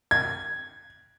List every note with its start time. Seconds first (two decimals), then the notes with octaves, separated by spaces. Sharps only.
0.11 G#6